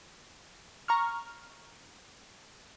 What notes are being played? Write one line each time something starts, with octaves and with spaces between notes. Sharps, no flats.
A#5 C#6 F6